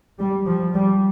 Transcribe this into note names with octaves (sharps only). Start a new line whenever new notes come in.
G3
F3
G3